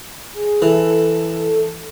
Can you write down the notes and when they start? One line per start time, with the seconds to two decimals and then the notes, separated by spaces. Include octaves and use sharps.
0.34 G#4
0.62 E3 A4